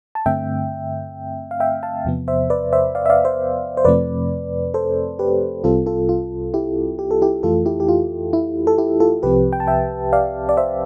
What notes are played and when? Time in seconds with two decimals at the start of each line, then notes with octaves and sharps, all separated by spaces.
0.15 A5
0.26 G2 D3 A3 C4 E5 G5
1.51 F5
1.60 E5 G5
1.83 F5 A5
2.05 E2 C3 F3 B3
2.28 C5 E5
2.50 B4 D5
2.73 C5 E5
2.95 D5 F5
3.06 E5
3.10 D5 F5
3.25 C5 E5
3.77 C5
3.85 F2 C3 F3 A3 C4 B4 D5
4.74 A4 C5
5.19 G4 B4
5.64 C2 C3 G3 C4 F4 A4
5.86 F4 A4
6.09 F4
6.54 E4 G4
6.99 G4
7.11 A4
7.22 E4 G4
7.43 F2 E3 A3 F4 A4
7.66 E4 G4
7.80 G4
7.89 F4
8.33 E4
8.67 A4
8.78 E4 G4
9.00 F4 A4
9.23 C2 C3 F3 C4 G4 B4
9.53 G5
9.60 A5
9.67 E5 G5
10.13 D5 F5
10.49 D5
10.57 C5 E5